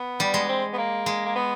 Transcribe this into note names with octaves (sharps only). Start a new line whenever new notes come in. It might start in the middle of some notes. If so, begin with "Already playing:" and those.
Already playing: B3
G3
G#3
C4
B3
A#3
G#3
A#3
B3